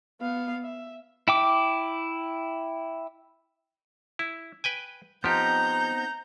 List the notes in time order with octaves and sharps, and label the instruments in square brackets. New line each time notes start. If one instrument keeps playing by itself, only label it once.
[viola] B3 F5
E5
[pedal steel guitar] E4 G5 D6
[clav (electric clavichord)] E4
B4 G5 G#5
[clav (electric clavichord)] F3 G4 [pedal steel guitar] B3 C4 D#4 [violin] A#5 G6